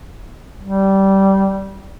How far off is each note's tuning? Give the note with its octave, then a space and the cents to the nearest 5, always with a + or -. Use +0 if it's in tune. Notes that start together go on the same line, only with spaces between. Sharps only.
G3 -15